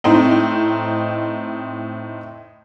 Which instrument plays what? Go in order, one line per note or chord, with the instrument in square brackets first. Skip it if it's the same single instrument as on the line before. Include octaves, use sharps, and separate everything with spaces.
[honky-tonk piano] A2 C4 D#4